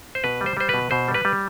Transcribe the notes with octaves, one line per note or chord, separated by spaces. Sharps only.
C5
B2 B4
G3
C5
G3 C5
B2 B4
B2 C5
G3
B4
G3